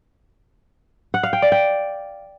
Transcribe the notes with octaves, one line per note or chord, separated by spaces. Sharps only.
F#5
F5
G5
D5
G5